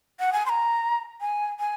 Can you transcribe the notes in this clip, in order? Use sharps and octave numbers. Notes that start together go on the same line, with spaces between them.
F#5
G#5
C6
A#5
G#5
G#5